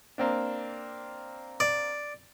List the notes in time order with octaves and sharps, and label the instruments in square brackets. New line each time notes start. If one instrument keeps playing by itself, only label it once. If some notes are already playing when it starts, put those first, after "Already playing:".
[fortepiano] A#3 C4 D4
[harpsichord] D5